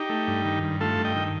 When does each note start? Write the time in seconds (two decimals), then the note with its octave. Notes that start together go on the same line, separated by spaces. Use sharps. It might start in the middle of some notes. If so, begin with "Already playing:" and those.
Already playing: D#4 G4
0.10 A3
0.28 G2
0.45 D#3
0.63 G2
0.81 A3 F4 A4
0.98 G2
1.05 D#5 G5
1.16 D#3